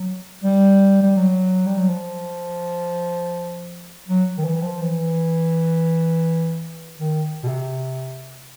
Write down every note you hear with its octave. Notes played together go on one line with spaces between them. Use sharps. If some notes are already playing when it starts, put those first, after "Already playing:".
Already playing: F#3
G3
G3
F#3
G3
F#3
F3
F#3
D#3
E3
F3
E3
D#3
B2
C3